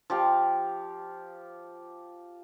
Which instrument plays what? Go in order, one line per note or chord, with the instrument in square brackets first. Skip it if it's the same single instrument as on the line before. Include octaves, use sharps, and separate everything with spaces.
[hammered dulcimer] F3 G4 F5